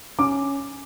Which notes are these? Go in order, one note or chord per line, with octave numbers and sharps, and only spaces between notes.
C#4 D6